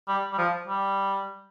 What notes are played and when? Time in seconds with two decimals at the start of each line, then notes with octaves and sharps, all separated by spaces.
0.08 G3
0.33 G3
0.38 F3
0.68 G3